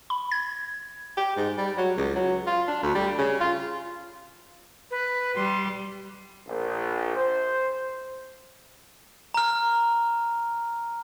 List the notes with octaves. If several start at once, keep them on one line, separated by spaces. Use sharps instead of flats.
B5
G#6
G4
G#2
G3
F#3
C#2
F#3
F4
D4
D2
G3
C#3
F4
B4
G3 C6
A#1
C5
A#5 F6